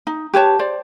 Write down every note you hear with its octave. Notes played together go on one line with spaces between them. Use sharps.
D#4
G4 B4 C#5 A5
C5 D5